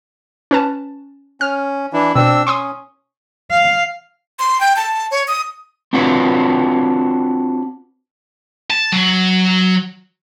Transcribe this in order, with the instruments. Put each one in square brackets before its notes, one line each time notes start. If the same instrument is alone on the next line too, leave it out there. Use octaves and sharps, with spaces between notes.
[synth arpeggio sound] C#4 B4 A5
[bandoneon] C#4 [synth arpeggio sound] F6
[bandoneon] E3 D4 E4
[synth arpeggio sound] B2 [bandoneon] C4 D4 E6
[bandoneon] C#4 [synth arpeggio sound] C6 C#6 D#6
[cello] F5
[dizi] C6
G5
A5
C#5
D#6
[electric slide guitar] C4 D4 F4 F#4 B4 C#5
[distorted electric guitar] A5
F#3